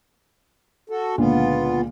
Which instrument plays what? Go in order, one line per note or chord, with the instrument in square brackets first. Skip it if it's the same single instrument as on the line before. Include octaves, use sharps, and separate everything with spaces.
[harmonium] F#4 A4
[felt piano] C#2 A#2 D3 [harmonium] B3 F4